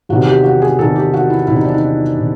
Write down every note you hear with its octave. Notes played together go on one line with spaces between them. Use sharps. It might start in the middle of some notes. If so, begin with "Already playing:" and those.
E2 C3 D#3 F#4
G4
F#4
G#4
E2 C3 D#3 A4
G4
F#4
E4
E2 C3 D#3 E4
D#4
D4
D#4
C3 D#3